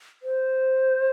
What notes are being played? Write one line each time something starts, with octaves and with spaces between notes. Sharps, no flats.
C5